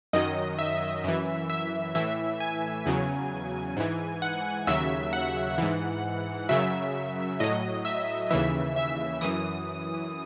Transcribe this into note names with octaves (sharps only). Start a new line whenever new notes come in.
F#2 D#3 F#3 D#5
E5
F#2 E3
E5
A2 E3 E5
G#5
E2 C#3 F#3
G#2 E3
F#5
D#2 C#3 F#3 E5
F#5
G#2 E3
F#2 C#3 F#3 E5
A2 F#3 D#5
E5
D#2 C#3 E3 E5
E5
F#2 E3 D#6